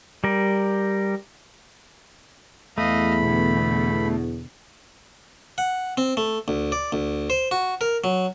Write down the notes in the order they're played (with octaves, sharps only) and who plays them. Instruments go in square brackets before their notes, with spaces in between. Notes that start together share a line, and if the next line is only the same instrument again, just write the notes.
[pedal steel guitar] G3 A#4
[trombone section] E2 [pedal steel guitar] A3 [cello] D#5 F5 [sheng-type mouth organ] B5
[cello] B2 D3
[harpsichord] F#5
C4
A3
D2
D5
D2
C5
F#4
A#4
F#3